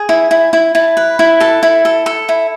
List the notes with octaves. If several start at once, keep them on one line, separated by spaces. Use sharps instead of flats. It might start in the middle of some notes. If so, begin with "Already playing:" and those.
Already playing: G#4
E4
E4
E4
E4 A5
B4
E4
A4 A5
E4
A4
A4
E4